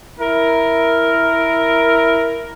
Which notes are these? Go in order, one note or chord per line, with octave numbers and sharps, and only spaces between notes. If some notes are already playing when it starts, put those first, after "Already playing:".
E4 A#4